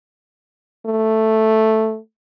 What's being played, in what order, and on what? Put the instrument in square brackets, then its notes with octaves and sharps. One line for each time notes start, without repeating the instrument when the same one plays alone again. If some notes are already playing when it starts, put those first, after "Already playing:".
[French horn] A3